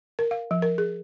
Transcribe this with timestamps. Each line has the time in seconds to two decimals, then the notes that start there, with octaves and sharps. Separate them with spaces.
0.19 A#4
0.31 F5
0.51 F3
0.62 A#4
0.78 G#4